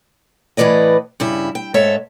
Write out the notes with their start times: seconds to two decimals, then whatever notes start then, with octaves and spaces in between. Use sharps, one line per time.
0.57 A2 E3 B4 D5 D#5
1.20 G2 C#3 E4
1.55 G5
1.74 G#2 A4 C#5 E5